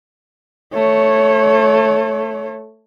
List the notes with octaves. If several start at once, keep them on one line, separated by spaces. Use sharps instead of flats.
A3 C#5